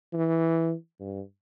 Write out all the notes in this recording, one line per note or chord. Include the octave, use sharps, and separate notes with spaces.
E3
G2